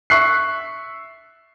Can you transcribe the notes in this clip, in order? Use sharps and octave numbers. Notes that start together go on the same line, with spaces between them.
E5 C#6 F#6 C7